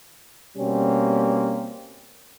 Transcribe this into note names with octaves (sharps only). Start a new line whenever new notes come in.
B2 G3 A#3 C4 C#4